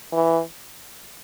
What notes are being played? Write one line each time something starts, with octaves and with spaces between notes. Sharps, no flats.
E3